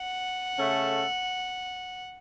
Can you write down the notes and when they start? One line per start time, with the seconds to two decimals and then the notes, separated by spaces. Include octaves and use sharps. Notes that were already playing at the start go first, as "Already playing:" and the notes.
Already playing: F#5
0.59 C#3 A3 C#4 A4